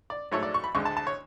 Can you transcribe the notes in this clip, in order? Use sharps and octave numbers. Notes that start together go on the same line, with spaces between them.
D5
G#2 F#3 A3 C#5
D5
C#6
B5
D2 D3 G#3 C#6
A5
A5
C#5